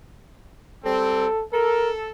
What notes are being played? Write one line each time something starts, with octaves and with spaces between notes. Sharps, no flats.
G3 C4 A4
A4 A#4